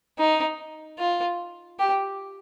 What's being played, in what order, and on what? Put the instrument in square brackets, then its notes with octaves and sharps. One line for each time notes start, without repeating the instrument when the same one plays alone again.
[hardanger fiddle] D#4
F4
G4